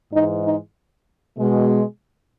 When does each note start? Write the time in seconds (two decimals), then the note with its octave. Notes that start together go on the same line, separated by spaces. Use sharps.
0.13 G#2 E3 G#3 D#4
0.44 D#4
1.39 B2 G#3